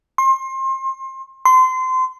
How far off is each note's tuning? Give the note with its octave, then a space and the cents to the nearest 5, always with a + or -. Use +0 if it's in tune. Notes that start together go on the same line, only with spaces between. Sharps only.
C6 +30
C6 -25